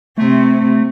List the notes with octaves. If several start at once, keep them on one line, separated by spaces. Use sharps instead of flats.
C3 A3 C4